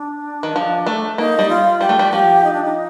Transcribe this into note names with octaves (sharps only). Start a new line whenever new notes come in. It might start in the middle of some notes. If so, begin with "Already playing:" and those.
Already playing: D4
D#3
F3
A3
A#3 D#4
G3
F4
G3 G4
A3
G3
F3 G4
D#4
D4
D#4